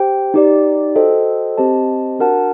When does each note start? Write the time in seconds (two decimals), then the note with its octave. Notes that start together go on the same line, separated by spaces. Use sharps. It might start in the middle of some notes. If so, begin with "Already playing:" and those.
Already playing: G4 C5 G5
0.34 D#4 G4 D5
0.95 F#4 A4 C5 D#5 G5
1.57 C4 G4 C5 D#5 A5
2.19 D4 F#4 A#4 F#5 A5